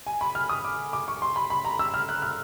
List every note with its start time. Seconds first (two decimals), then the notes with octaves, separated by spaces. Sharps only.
0.07 G#5
0.21 B5
0.35 F6
0.49 D#6
0.65 D6
0.93 D6
1.08 C#6
1.22 C6
1.36 B5
1.50 B5
1.65 A#5
1.79 E6
1.94 F6
2.09 F#6
2.22 F6